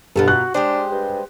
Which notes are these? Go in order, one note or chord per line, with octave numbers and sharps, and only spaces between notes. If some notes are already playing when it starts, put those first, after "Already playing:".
G2 B2 F4 A4 A#5
F#4 F#6
G#3 D4 G4 C5
G2